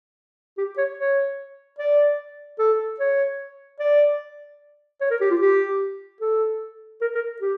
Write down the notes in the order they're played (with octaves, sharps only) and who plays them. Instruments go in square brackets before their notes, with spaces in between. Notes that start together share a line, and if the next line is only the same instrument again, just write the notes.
[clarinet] G4
C#5
C#5
D5
A4
C#5
D5
C#5
A#4
G4
F4
G4
A4
A#4
A#4
G4